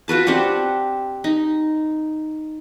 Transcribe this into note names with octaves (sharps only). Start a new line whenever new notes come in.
F4 F#4 B4 A5
C4 D4 G4 F#5
D#4